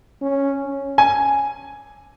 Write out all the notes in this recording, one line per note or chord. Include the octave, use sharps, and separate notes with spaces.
C#4
C#4
G#5